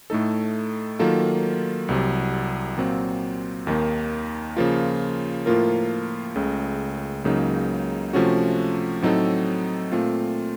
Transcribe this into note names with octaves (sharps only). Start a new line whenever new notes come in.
A2 A3 D#4 A4
D#3 F#3 A#3 F4 A4
C2 C3 F#3
A#2 F#3 C4 F4
D#2 D#3 A#3 D#4
C#3 F3 A#3 F4
A2 F3 A#3 F4 A#4
C#2 C#3 A3
C#2 C#3 F#3 A#3 D#4
C3 F3 A3 C#4 F#4
A2 F#3 C4 D#4 A4
A#2 A3 C4 F4